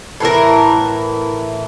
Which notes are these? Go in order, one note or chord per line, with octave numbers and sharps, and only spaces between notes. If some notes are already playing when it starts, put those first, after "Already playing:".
A2 E3 E4 A#4